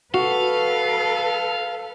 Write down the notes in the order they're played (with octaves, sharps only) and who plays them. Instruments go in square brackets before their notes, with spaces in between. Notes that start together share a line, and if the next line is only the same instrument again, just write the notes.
[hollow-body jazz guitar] F#4 [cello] A4 B4 [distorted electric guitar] F5